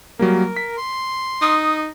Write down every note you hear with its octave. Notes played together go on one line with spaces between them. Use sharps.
F#3 G3 A#3 A#4
B6
C6
D#4 D#6